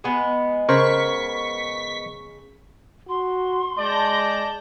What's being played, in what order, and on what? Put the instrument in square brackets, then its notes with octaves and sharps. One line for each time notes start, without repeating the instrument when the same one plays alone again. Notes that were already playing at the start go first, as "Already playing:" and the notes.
[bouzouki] G#3 B3
[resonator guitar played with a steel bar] C#3 [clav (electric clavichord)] A#4 C5 [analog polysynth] C#6 B6
[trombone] F#4 [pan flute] C6
[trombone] G#3 [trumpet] D5 [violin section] A5 G6 A#6